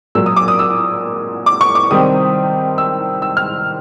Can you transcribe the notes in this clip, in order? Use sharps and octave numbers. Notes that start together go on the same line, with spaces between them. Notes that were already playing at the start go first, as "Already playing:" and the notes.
A#2 F#3 A#3 E6
D#6
D6
D#6
E6
D6
C#6
D6
C3 D#3 G3 C4 D#6
E6
E6
F6